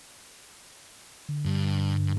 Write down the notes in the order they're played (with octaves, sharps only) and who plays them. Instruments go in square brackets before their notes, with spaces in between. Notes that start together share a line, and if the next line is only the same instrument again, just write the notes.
[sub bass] D3
[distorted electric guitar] G2